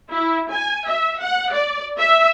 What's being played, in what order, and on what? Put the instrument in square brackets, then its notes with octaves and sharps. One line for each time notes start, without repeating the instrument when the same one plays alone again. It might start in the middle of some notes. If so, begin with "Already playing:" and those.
[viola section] E4
G#5
E5
F#5
D5
E5